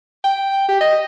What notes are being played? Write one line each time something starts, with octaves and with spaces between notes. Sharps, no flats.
G5
G4
D#5